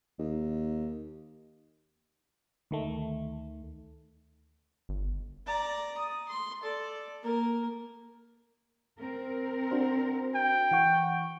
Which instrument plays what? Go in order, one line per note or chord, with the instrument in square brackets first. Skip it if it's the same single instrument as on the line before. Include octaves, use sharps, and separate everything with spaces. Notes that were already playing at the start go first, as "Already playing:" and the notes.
[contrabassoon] D#2
[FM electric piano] D2 D#3 A3
[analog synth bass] G1
[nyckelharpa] D5 A#5
D#6
C6
A4 D5
A#3 A#4
[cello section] C4 A#4
[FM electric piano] D4 F#4 C5
[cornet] G5
[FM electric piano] E3 F#5 C#6